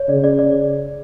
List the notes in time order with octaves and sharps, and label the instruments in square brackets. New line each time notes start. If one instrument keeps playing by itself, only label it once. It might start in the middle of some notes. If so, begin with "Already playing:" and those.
Already playing: [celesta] C#5
[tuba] C#3 [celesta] D5
[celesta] D5
D5